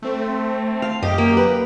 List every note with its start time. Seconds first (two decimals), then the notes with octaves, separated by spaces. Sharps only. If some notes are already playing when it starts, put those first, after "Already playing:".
0.02 A3 C4
0.82 F5
1.03 F#2 G4 D#5
1.18 A#3
1.37 B4